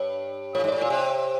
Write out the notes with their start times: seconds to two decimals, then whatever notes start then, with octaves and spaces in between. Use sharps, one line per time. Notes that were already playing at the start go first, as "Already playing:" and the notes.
Already playing: G2 C#5
0.55 A2 C#5
0.64 G#2
0.68 A2 D5
0.81 A#2 C#5
0.90 C3